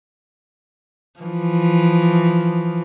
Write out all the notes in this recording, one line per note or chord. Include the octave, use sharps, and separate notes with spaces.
E3 F3